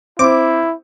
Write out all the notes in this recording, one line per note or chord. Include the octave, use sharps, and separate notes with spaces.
C4 E4 D6